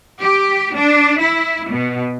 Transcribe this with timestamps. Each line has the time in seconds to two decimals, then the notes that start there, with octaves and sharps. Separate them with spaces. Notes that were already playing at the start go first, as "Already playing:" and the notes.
0.22 G4
0.75 D4
1.21 E4
1.70 B2